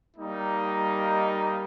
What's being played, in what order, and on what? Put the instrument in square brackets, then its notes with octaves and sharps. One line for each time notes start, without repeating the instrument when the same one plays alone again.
[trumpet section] G3 A#3 D#4